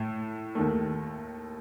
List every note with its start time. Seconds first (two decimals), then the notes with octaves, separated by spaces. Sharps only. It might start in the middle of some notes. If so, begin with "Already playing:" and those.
Already playing: A2 A3
0.55 D#2 D#3 A3